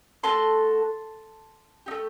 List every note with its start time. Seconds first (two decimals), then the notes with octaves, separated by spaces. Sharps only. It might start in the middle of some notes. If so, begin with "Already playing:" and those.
0.23 A3 C4 F#4 A4 A5 C6
1.86 D#4 G4
1.91 A3